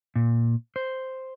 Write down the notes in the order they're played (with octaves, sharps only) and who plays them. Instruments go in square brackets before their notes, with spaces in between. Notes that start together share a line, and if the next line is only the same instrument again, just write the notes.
[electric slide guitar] A#2
C5